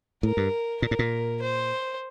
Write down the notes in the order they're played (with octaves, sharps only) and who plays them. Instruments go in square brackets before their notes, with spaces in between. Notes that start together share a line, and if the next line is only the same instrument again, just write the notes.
[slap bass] A2 [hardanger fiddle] A#4
[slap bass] G2
[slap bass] A#2 [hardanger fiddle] A#4
[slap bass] A2
A#2
[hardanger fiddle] C5